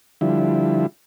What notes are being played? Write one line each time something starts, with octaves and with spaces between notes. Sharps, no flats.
D3 F3 G3 E4